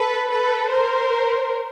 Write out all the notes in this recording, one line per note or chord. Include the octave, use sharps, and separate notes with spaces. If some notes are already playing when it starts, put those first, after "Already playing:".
Already playing: A4 B4
A4 B4
A#4 C5